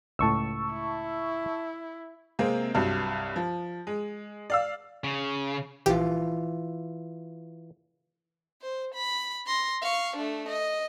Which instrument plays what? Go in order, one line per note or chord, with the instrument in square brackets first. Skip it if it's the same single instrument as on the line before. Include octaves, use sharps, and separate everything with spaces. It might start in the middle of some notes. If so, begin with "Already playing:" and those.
[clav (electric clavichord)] C#2 A2 [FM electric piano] A5 C#6 E6
[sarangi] E4
[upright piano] C3 G#3 A#3 C4
C2 G2 F#3
F3
G#3
D5 F5 E6
[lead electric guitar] C#3
[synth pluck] A#1 G4 G5 [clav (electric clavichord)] E3 F4
[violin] C5
B5
C6 A#6
F5 C#6
A3 D4
D#5